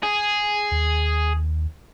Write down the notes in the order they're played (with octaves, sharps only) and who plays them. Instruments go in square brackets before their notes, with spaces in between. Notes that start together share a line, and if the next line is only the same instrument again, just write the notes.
[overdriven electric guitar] G#4
[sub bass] D#2